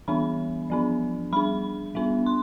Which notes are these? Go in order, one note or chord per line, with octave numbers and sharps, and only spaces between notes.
E3 G3 B3 D4 B5
F3 B3 D4
G3 D4 B5
G3 B3 D4
C6